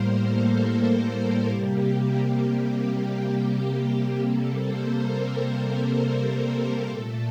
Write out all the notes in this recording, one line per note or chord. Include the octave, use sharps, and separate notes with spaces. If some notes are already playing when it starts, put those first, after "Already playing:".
Already playing: A2 G3 A#3 A#4 C5
A4
C3 G3 A#3 G4
G4
C3 G3 A#3 A4
C5
A#4
A4
A#2 A3